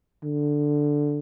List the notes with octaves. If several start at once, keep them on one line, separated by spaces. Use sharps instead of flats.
D3